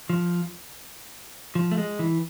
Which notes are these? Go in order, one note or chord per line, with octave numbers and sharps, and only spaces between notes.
F3
F3
A3
G#3
E3